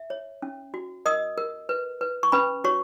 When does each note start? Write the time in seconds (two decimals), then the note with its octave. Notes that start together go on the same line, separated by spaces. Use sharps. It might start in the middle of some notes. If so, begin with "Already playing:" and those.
Already playing: E5
0.10 C#5
0.42 C#4
0.74 F#4
1.06 A#4 D#5 D#6
1.38 A#4
1.69 B4
2.01 B4
2.23 C#6
2.32 C#4 B4 B5
2.64 F#4 C#5 C#6